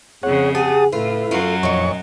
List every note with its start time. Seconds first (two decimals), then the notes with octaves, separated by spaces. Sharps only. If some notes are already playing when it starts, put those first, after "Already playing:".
0.23 F2 C#3 G#4 C#5 F#5
0.55 G4 G#4 F#5 A5 D#6
0.93 A2 E4 F4 A4 B4
1.31 F#2 F#3 F4
1.63 F2 A#2 D#3 C#5 D#5 C#6